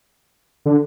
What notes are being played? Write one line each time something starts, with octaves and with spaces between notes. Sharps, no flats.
D3